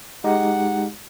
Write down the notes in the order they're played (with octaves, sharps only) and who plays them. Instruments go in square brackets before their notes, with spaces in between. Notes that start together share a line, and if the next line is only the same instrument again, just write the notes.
[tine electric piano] G#3 D#4 G4 [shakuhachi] F#5